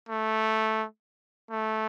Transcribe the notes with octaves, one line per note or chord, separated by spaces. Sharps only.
A3
A3